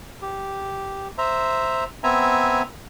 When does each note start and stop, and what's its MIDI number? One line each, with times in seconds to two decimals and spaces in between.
0.22 1.08 67
1.18 1.84 72
1.18 1.84 76
1.18 1.84 82
2.03 2.62 59
2.03 2.62 60
2.03 2.62 76
2.03 2.62 80
2.03 2.62 82